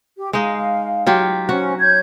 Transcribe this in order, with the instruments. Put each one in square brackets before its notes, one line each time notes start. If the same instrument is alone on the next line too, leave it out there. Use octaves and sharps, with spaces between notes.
[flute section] G4
[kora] G#3 D#4 [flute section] F5
[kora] F#3 F4 G4
[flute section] C#4 C5 [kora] F#4
[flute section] C#5 G6 G#6